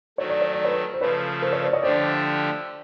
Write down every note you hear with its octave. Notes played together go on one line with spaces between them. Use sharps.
D#3 F#3 A3 C#5
D5
C#5
D5
B4 C#5
C5
C#3 F3 A3 B4 C#5
A#4 C5
B4 C#5
C5 D5
C#5 D#5
D3 F3 A3 D4 G4 C5 D5